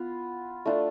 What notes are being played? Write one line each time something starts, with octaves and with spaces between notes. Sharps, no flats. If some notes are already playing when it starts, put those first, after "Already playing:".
Already playing: B3 F4
A3 D4 F4